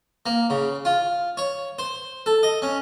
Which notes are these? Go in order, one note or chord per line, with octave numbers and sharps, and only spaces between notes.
A#3
C#3
F4
C#5
C5
A4
D#5
C#4